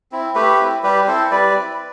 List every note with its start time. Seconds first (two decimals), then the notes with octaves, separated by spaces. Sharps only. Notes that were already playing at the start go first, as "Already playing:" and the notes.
0.12 C4 E4
0.35 A3 G4 B4
0.60 C4 E4
0.83 G3 G4 B4
1.07 C4 E4 A4 C5
1.31 G3 B4 D5
1.55 C4 E4